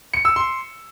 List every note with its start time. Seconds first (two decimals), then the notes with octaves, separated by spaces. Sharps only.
0.14 C#7
0.25 E6
0.36 C6